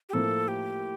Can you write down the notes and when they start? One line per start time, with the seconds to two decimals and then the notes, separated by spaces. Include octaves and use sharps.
0.09 G4
0.13 A2 F3 A#3 A4
0.48 G4